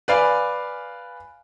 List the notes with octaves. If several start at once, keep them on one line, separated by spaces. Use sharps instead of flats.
B4 D5 F5 G#5